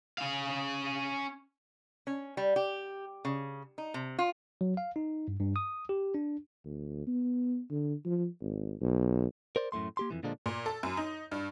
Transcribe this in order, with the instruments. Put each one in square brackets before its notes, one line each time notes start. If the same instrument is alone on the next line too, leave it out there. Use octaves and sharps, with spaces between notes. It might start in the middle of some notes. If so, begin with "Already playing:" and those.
[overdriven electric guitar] C#4 F5
[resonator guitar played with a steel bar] C#4
G3
G4
C#3
D#4
C3
F4
[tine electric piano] F#3
F5
D#4
G2
G2
D#6
G4
D4
[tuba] D2
B3
D3
F3
G#1
B1
[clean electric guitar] A#4 C5 D5
F#2 A2 A3 C6
A#3 G4 C6
F2 D#3 E3
A#2 D3 F3 G#3 A#3 D4
[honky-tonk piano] A#2
A4
F#2
D#4
G2